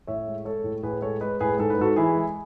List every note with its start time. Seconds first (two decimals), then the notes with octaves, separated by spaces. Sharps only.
0.07 A2 C#5 E5
0.27 G#3
0.45 G#3 A4 C#5
0.64 A2
0.83 A2 G#4 B4
1.02 G#3 A4 C#5
1.21 G#3 B4 D#5
1.40 A2 G#4 B4
1.59 G#2 A4
1.70 B4
1.78 G#2 F#4 A4
1.96 E3 E4 G#4
2.15 G#3